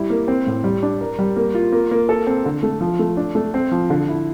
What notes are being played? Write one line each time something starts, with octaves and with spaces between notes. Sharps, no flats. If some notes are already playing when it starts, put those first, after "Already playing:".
Already playing: G3 E4
A#3
C4
A2
G3
D4
A#4
G3
A#3
F4
A#3
A#3
A4
C4
D3
A3
F3
A3
D4
A3
C4
F3
D3
E4